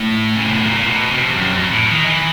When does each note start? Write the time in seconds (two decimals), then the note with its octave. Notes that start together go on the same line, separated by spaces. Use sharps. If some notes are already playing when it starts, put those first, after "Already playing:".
Already playing: A2
0.35 C#3
0.45 C3
0.54 B2
0.63 A#2
0.76 A#2
0.87 B2
1.11 C3
1.23 F2
1.35 F#2
1.53 F2
1.71 A2
1.89 D#3
2.06 E3